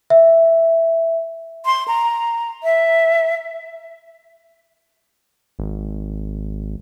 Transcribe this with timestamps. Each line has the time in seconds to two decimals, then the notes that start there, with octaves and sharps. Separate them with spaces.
0.10 E5
1.66 C6
1.88 A#5
2.63 E5
5.59 G#1